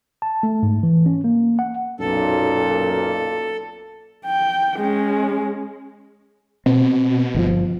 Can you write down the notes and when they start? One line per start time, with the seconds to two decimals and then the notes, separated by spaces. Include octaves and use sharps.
0.22 A5
0.43 A3
0.63 G#2
0.83 E3
1.06 C#4
1.24 A#3
1.59 F#5
2.00 B1 F#2 A#2 A4
4.26 G5
4.77 G#3 C#4
6.66 B2 C4
7.35 G1 C#3 F3